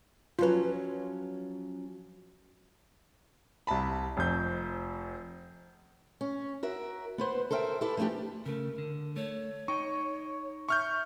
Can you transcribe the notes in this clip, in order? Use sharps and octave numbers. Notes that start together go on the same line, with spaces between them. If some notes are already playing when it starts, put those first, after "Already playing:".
F3 F#3 C#4 F4 B4
C2 E4 A5 B5
F1 F2 G6
C#4
F#4 A#4 E5
B3 B4 C5
A4 A#4 C5 E5 G5
E4 G4 A4 B4
F3 A3 A#3 D4 G4
C#3 A3 A#4
D3
A3 C#5
D#4 G5 C#6
E5 C#6 F6 G6